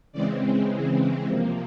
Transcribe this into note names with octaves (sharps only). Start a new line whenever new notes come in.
C#3 E3 G#3 C4 D5
C3 F3 A#3